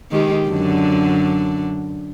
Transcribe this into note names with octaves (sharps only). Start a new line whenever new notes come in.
D#3 G#3 G4
F#2 D3 D4